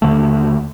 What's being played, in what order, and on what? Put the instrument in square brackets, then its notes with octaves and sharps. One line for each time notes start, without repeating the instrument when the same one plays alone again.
[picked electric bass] D#2 D3 A3